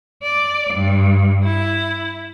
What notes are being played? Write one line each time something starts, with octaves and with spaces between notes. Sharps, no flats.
D5
G2
E4